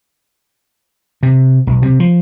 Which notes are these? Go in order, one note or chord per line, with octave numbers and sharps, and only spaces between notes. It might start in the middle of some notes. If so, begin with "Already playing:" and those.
C3
B1
C3
F3